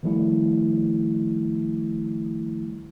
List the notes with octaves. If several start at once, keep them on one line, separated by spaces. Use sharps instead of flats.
D#3 F3 G3 A3 E4